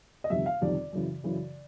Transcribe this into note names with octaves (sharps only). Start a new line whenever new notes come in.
D#5
G1 F2 C3 D#3 E5
F5
G1 F2 C3 D#3 D5
F#2 C#3 E3
F#2 C#3 E3